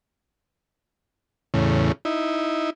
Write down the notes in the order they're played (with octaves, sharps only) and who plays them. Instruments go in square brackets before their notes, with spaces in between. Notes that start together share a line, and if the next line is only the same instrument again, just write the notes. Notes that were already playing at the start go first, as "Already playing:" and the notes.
[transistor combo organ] E2 A2 C#3
D#4 E4